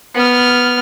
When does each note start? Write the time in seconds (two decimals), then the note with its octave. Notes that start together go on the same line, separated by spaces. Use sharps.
0.15 B3 F6